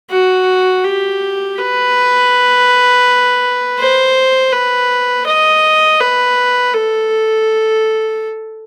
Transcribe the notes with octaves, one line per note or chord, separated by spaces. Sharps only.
F#4
G4
B4
C5
B4
D#5
B4
A4